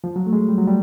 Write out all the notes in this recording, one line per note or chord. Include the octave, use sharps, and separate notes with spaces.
F3
F#3
A3
G#3
G3
F#3
G3